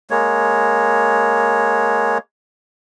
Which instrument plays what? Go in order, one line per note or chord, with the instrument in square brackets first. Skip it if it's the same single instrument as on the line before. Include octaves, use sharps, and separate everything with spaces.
[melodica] G#3 A#3 C#5